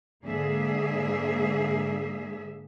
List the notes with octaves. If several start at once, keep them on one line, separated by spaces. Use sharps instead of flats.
G#2 D3 A#3 D4 G#4 E5